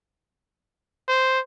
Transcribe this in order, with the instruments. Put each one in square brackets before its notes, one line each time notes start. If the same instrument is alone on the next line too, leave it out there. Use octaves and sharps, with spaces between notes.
[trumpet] C5